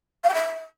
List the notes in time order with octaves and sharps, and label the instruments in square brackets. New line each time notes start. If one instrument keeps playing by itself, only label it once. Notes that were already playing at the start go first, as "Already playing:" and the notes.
[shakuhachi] F5
G5
E5